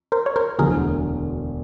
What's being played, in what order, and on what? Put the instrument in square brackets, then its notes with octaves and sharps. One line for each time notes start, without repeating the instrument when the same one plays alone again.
[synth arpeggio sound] A#4 C5
C#5
A#4 C5
[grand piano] E1 D2 D3 F#3 [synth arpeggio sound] G#4 A#4